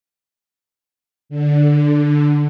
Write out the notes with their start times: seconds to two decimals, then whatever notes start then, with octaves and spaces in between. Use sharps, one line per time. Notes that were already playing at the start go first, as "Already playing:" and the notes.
1.29 D3